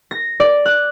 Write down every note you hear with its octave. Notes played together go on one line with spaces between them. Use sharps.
A#6
D5
F#6